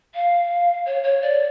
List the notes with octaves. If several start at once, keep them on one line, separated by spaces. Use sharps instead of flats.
F5
C#5
C#5
D5